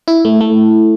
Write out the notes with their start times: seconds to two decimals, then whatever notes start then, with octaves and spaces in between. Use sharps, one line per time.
0.08 E4
0.25 A3
0.41 A3